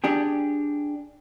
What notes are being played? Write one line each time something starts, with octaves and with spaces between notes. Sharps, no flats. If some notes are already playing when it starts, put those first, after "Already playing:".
D4 G4 G#4